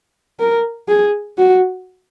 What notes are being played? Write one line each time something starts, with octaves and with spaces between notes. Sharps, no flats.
A#4
G#4
F#4